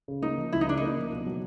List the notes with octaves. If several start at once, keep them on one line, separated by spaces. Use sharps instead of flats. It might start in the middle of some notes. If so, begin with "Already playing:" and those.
C#3
A#3 D#4
F3
C#2 E4
D#4
C#3 D4
A#3 D#4
F3
B2
F#3